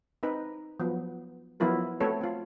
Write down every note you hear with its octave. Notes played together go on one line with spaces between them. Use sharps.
C4 D#4 B4
F3 F#3 B3
F3 F#3 B3 E4 F4 A#4
A3 C4 F#4 A4 B4 C#5
C4 F4